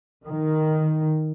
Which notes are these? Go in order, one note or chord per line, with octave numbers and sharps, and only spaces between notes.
D#3